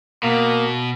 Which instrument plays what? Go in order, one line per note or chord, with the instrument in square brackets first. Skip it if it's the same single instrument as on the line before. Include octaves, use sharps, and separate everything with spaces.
[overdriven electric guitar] B2 [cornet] A#3